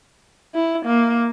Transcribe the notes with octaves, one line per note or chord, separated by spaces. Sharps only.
E4
A#3